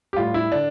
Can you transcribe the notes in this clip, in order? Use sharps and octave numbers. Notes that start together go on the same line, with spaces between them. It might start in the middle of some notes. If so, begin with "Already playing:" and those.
G4
A2 G3 F4
E4
D3 D4